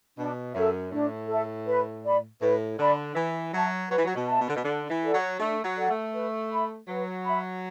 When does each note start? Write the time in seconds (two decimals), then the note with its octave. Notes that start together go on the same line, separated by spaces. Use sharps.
0.18 B2 D4
0.55 F#2 A4 E5
0.92 A2 D4
1.29 A4 E5
1.66 B4
2.04 D5 B5
2.41 A2 B4
2.78 D3 D5 B5
3.15 E3 B4
3.53 F#3 E5 A5
3.89 F#3 B4
3.97 E3
4.05 F#3
4.15 B2
4.27 E5 A5
4.40 B2
4.48 D3
4.55 B2
4.64 D3 D4
4.90 E3
5.02 A4 D5 F#5
5.14 F#3
5.39 A3 D4
5.64 F#3
5.77 A4 D5 F#5
5.89 A3
6.14 B4
6.51 E5 B5
6.88 F#3 B4
7.25 E5 B5